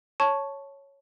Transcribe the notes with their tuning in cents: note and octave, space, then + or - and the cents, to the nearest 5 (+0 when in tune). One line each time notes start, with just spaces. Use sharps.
C#5 +0 A5 -5 C#6 +0